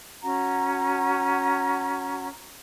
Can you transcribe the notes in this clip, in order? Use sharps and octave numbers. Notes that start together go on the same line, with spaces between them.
C#4 F#4 F#5 A#5